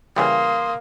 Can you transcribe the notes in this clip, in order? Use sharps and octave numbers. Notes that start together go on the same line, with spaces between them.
C#3 E3 G3 A#3 C6 D#6